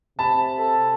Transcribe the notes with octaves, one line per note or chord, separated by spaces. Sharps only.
C3 A5 B5
A4